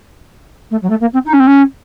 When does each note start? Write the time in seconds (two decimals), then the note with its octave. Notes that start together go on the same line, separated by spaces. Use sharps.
0.71 A3
0.82 F#3
0.90 A3
1.00 A#3
1.13 C4
1.25 D#4
1.33 C#4
1.40 C4
1.47 C#4